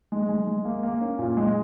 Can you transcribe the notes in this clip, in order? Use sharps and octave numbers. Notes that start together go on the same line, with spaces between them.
G#3
G#3
G#3
A#3
A#3
C#4
A#2
G#3